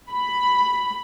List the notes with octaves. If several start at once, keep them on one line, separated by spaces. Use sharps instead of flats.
B5